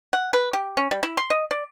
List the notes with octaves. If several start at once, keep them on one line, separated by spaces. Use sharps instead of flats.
F#5
B4
G4
C#4
G3
E4
C6
D#5
D5